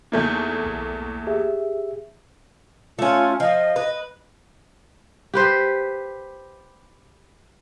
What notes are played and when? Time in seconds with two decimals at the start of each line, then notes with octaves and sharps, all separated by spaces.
0.12 E2 A3 A#3 D#4 G6
0.66 B1
1.27 G4 G#4 E5
2.99 A3 C#4 F4
3.40 F3 D#5
3.76 B4
5.34 G4 B4 C5